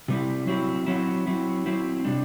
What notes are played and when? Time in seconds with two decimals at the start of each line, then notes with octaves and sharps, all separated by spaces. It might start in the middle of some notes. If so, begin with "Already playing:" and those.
0.08 C3 G3 C4 E4
0.47 F#3 C4 E4
0.87 F#3 C4 E4
1.27 F#3 C4 E4
1.66 F#3 C4 E4
2.05 C3 G3 D4